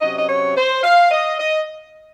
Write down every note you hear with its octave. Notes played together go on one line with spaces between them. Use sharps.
C3 F#3 C#4 D#5
D#5
C#5
C5
F5
D#5
D#5